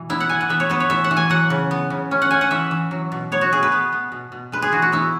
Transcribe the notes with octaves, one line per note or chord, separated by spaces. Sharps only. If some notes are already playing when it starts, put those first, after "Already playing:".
Already playing: B2 E3
B3 E4
F#5
E3 G#5
F#5
B3 E5
C#5
B3 B4
C#5
E3 E5
F#5
E3
G#5
F#3 F#5
C#3
B3
C#3
C#4
F#5
C#4 G#5
F#5
E3 E5
E3
F#3
B2
B3 C#5
F#4
B2 G#4
B4
B3
B3
B2
B2
G#3 B4
G#4
E3 F#4
F#4
B3 E4